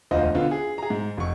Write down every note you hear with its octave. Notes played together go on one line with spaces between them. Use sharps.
E1 D2 F4 C5 D#5
D3 B3 F4
G#4
G#4 A#5
G#2
F1 C#6